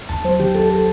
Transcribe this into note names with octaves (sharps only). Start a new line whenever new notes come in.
D#2 A5
F#3 C5
D#3 G4
D#3 A4
A4